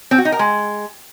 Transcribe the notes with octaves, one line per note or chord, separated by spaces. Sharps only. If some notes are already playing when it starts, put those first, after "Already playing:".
C4
F#4
D#4
A#4
G#3